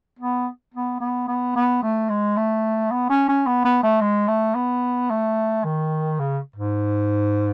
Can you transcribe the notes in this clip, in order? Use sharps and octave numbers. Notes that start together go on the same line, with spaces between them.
B3
B3
B3
B3
B3
A3
G#3
A3
B3
C#4
C#4
B3
B3
A3
G#3
A3
B3
A3
D#3
C#3
G#2